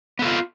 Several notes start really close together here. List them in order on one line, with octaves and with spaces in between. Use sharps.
B3 A4 F4